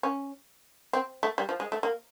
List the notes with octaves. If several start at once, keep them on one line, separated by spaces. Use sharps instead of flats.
C#4
C4
A3
G3
F3
G#3
A3
A#3